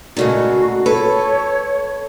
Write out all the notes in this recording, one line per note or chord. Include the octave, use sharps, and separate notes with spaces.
A#2 C#3 G#3 A3 D#4 F#4
A4 B4 C#5